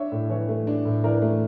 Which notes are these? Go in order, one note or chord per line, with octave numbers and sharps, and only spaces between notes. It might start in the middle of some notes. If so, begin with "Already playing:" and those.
Already playing: D4 C#5 E5
A2
E3 C#5
A3
D4
A2
E3 A#4 D5
A3